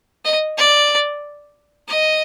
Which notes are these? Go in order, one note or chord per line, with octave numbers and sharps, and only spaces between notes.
D#5
D5
D#5